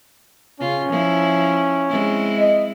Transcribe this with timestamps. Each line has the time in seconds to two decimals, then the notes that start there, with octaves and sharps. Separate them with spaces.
0.60 C#3 C#4 F4
0.89 F3 E4
1.89 G#3 C4 E4
2.39 D#5